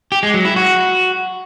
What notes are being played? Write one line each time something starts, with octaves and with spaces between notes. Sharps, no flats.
G4
G#3
F#3
E4
F#4